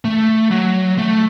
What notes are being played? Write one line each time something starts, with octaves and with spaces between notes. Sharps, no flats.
A3
F#3
A3